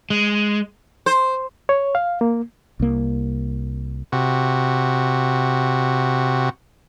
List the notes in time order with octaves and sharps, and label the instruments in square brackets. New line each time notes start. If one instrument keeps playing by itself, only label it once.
[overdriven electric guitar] G#3
[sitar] C5
[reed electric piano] C#5
F5
A#3
[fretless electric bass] C2 A#3
[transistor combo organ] C3 F#4